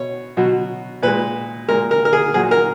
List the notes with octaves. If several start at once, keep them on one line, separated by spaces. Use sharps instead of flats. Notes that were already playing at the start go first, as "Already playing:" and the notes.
Already playing: B2 C#5
B2 F#3
A#2 G#3 B4
A#2 G#3 A#4
A#4
A#4
G#4
A#2 F#3 G#4
A#4